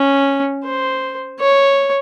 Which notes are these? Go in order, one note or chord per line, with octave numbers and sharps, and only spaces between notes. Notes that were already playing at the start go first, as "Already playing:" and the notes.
Already playing: C#4
C5
C#5